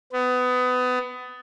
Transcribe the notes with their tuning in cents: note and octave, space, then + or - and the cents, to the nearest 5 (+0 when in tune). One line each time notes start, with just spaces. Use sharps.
B3 +25